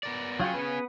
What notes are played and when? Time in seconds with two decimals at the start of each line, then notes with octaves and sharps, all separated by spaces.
0.03 B3 A#4 D5
0.40 F#3 C#4 F4 G#4 G5
0.54 B3 B4